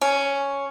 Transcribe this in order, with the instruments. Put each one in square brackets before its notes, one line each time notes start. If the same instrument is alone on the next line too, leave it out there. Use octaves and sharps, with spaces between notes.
[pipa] C#4